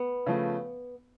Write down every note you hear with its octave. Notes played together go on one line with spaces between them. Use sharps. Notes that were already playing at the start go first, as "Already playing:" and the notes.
Already playing: B3
C#3 F3 A3